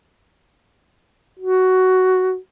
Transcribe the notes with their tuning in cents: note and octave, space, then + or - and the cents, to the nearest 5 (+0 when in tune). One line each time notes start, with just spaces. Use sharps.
F#4 +10